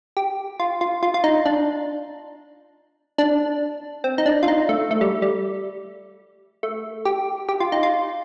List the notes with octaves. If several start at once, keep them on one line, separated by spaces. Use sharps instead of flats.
G4
F4
F4
F4
F4
D#4
D4
D4
C4
D#4
D4
F4
D#4
A3
A3
G3
G3
A3
G4
G4
F4
D#4
F4